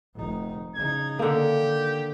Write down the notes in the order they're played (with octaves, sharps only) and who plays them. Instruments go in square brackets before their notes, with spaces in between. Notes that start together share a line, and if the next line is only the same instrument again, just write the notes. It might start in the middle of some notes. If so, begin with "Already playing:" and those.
[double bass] F1 D#4
[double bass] C#3 D#4 [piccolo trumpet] G#6
[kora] D3 A#3 [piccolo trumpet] G4
[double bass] D#3